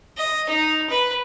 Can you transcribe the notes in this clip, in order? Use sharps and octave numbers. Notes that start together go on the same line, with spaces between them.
D#5
D#4
B4